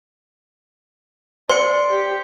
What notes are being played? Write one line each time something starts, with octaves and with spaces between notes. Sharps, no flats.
C5 D5 C6 C#7
G4